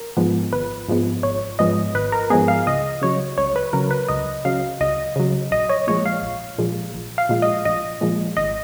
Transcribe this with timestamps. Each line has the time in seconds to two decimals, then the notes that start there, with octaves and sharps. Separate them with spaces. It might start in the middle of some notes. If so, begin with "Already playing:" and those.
Already playing: A#4
0.17 G#2 F3 G#3 B3
0.53 G#1 B4
0.89 G#2 F3 G#3 B3
1.23 G#1 C#5
1.59 G#2 F3 G#3 B3 D#5
1.95 G#1 B4
2.12 A#4
2.30 G#2 F3 G#3 B3 G#4
2.48 F5
2.66 C#2 D#5
3.01 C#3 F#3 C#5
3.38 C#2 C#5
3.56 B4
3.73 C#3 F#3 A#4
3.91 B4
4.08 C#2 D#5
4.45 C#3 F#3 F5
4.80 C#2 D#5
5.16 C#3 F#3
5.51 A#1 D#5
5.70 C#5
5.87 A#2 F3 G#3 C#5
6.06 F5
6.22 A#1
6.58 A#2 F3 G#3
6.94 A#1
7.18 F5
7.29 A#2 F3 G#3
7.42 D#5
7.65 A#1 D#5
8.01 A#2 F3 G#3
8.37 G#1 D#5